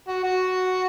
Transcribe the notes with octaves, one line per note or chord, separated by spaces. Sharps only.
F#4
F#4